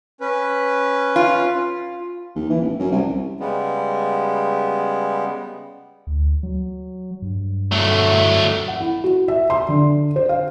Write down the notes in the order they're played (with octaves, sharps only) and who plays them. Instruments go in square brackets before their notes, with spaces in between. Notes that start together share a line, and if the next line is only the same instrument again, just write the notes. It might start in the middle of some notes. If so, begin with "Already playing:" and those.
[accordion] C#4 B4
[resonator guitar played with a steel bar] F4
[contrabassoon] D#2
E3
A1
F#2
C2
[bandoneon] C#3 G3 G#3 B3
[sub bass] D2
F#3
G2
[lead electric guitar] F#3 A3
[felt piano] F#5
E4
F#4
E5
C6
D3
C5
F5